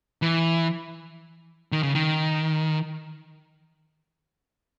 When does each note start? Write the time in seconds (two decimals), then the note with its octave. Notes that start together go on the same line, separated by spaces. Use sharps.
0.22 E3
1.72 D#3
1.83 C#3
1.95 D#3